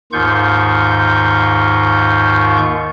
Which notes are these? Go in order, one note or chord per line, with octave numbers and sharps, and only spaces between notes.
D#2 G#2 D#3 F4 C#6 G6